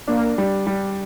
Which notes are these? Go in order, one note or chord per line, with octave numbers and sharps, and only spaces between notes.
A#3 D4
G3
G3